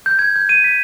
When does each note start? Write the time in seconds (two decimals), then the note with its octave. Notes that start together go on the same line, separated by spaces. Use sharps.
0.06 G6
0.19 G#6
0.36 G6
0.49 D#7
0.64 B6